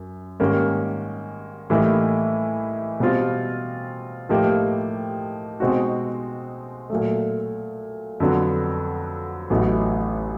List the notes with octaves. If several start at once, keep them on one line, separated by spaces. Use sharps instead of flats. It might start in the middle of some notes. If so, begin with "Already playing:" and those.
Already playing: F#2
G#2 D#3 G3 A#3 C#4
A2 E3 G3 A#3 D#4
B2 G3 C4 F4
A2 F3 A#3 D#4 G4
B2 G#3 C4 D#4 F#4
A#2 F#3 A3
F2 D3 F#3 B3
A1 A2 F#3 B3 D#4